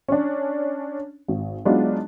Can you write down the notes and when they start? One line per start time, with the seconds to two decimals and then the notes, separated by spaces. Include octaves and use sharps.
0.08 C#4 D4
1.28 G#1
1.65 F#3 G#3 B3 D4 D#4 F4